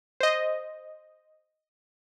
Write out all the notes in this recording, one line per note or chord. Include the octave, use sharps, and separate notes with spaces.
C5 D#5